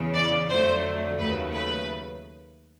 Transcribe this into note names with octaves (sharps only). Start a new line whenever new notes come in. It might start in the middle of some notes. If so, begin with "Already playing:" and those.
Already playing: E2 C#3 E3
D5
F2 D3 F#3 A3 C5
D#2 C#3 F#3 A3 B4
B4